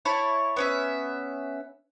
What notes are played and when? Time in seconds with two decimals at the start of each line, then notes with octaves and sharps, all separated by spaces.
0.05 E4 C#5 A5
0.56 B3 C#4 E5